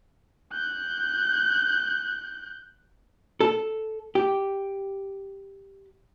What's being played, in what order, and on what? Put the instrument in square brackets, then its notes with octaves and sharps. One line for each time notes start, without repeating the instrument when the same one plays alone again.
[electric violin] F#6 G6
[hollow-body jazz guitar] A4
G4